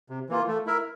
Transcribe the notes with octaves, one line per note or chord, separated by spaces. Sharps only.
C3
E3 A#3 F4
A3
E4 A#4 E5